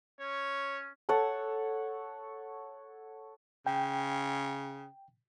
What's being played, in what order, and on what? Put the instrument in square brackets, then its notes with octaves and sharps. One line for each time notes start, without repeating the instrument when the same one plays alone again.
[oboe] C#4 [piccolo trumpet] C#5
[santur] A4 C#5 F#5 A5
[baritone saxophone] C#3 [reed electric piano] G5